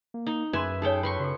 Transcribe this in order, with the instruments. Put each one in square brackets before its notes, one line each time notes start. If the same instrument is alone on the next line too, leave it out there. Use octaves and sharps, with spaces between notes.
[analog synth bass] A#3
[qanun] D#4
[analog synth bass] F#2 [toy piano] G#4 C6 [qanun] B4 E5 G#5
[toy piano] D#4 B4 C#5 [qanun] G#4 A4 G5
[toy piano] F4 [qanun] B4 C6 C#6
[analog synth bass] C#3 [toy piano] F#4 A4